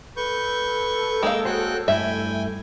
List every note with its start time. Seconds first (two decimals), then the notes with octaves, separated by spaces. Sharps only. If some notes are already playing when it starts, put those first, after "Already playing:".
0.17 A4 B4 C#6 G6
1.23 G#3 A#3 F5 G5 E6
1.45 F#4 C5 C#5 G5 F#6
1.88 G2 A3 E4 E5 G5 G#5